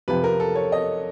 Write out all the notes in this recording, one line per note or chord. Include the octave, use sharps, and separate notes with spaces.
F2 C3 F3 B4
A#4
A4
C#5
D#5